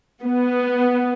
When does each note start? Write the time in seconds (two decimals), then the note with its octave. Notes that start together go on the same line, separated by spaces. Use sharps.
0.22 B3